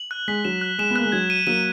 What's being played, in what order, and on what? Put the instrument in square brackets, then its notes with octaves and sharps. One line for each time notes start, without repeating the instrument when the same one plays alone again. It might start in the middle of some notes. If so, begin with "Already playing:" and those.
Already playing: [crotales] F#7
F#6
[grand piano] G#3 [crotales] B6
[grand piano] F#3 [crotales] E7
[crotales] F#6
[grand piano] G#3 [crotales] E7
[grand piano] B3
[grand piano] A#3 [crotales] F#6
[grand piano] G#3
[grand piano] F#3 [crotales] G#6
[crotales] D#7
[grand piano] F#3 A#3 [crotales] D#7